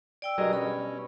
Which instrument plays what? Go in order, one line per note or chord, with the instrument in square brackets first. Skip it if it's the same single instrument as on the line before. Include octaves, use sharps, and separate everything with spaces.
[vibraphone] D5 G5 E6
[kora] G2 B2 D#5 [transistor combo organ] F#3 G#4 A#4
[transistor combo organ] C#4 [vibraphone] B5